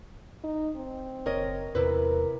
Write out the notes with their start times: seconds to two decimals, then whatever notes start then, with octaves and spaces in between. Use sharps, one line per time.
0.44 D#4
0.76 C4
1.26 F#1 A#4 C#5 D#5
1.75 E2 C3 E4 A#4 B4